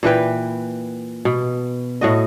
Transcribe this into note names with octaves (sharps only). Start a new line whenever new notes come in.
A#2 E3 B4 G5
B2
A2 F#4 D#5